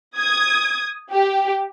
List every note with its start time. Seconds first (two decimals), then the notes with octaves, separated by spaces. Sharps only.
0.17 D#6 G#6
1.11 G4